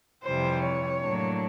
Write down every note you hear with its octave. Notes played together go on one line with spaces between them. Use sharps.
F2 C3 E3 G3 C5
C#5
A2 F#3 A#3 D4